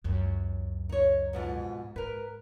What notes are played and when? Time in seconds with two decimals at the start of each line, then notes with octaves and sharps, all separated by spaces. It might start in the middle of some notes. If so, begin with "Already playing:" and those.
0.04 C#2 F#2
0.89 D#4 C#5
1.33 F2 G#2 B2
1.96 G#2 A#4 B4